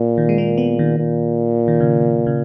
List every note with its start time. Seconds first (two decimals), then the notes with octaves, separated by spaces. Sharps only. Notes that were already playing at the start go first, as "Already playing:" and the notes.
Already playing: A#2
0.18 D#3
0.29 G#3
0.38 A#3
0.58 B3
0.79 D#3
0.98 A#2
1.68 D#3
1.80 C#3
2.27 C#3